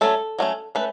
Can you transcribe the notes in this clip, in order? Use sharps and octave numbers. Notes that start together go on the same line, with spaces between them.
F#3 A3 C#4 A4
F#3 A3 C#4
A3 C#4 B4